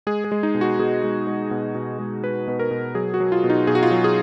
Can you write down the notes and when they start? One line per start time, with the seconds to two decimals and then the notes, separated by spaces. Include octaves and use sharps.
0.07 G#3 G#4
0.24 G#4
0.32 G#3
0.43 D#4
0.54 B2
0.61 F#4
0.79 B2 G#4
1.03 G#3
1.27 G#3
1.51 B2
1.75 B2
1.99 G#3
2.24 G#3 B4
2.48 B2 B4
2.59 A#4
2.71 B2
2.95 F#3 G#4
3.14 F#4
3.20 F#3
3.32 F4
3.44 B2
3.50 D#4
3.67 B2 G#4
3.75 F#4
3.83 F4
3.90 F#3 F#4
4.04 G#4